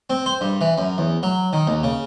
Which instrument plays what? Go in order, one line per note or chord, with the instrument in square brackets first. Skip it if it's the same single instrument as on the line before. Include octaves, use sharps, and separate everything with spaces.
[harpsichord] C4
C5
G2
E3
F#2
E2
F#3
D#3
D#2
C#3